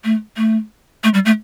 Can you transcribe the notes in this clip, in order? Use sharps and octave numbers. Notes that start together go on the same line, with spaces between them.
A3
A3
A3
G3
A3